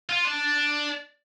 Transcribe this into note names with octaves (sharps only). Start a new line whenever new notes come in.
F4
D4